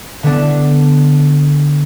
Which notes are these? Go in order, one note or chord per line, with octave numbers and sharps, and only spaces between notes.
D3 B3 D4